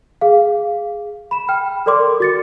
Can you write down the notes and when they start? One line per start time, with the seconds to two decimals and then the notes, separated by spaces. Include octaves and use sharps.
0.21 G#4 F5
1.31 B5 E7
1.49 G5 F6
1.86 A4 A#4 D5 C6 D6
2.20 F#4 A6 C#7